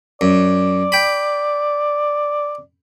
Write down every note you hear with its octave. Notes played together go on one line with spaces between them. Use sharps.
F#2 D5
G5 B5